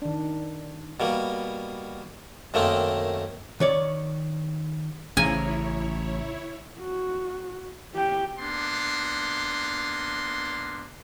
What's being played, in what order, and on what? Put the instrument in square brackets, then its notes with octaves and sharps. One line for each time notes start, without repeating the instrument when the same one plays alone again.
[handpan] D#3 D4
[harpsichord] B2 G3 A#3
F#2 D#3 A3 A#3 C4 D#4
[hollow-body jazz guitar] D#3 C#5 D5
[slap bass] A1 A2 [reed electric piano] C#3 A#5 [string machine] E4 C#5 [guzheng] G#5
[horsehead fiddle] F#4
G4 G5
[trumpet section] A#3 B3 D4 C6